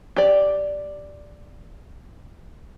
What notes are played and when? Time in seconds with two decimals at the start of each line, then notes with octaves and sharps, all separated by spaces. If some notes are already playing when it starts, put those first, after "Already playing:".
0.16 G4 D5